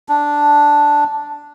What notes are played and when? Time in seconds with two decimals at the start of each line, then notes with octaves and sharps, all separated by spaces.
0.09 D4